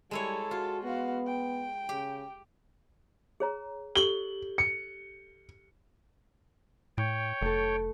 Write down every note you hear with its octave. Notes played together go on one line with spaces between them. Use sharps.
G3 G#3 E4 A4 C#5
F4 F#4
B3 F#4 F5
G5
C#3 G4
G#4 C#5 A#5
G4 A4 F#7 G7
C#7
A2 C#5 G5
F1 A3 A4